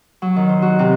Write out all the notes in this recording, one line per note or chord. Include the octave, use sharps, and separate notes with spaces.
F#3
D#3
C5
F#4
C3